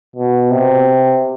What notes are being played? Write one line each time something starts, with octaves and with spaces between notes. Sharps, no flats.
B2
C3